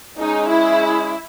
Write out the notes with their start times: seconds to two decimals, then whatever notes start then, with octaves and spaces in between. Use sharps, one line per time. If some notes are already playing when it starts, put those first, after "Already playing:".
0.18 G#3 C#4 D#4 G#4
0.48 E4